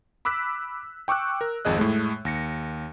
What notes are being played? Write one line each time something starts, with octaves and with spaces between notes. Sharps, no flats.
B5 D6 E6 F#6 B6
G5 C#6 D6 E6 F#6
A#4
G#1 F2 G#4 D#5 F#6
A2 G#3 A3
D#2 A#6 C#7